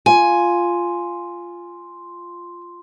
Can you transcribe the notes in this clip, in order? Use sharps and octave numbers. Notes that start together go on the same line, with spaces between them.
F4 G#5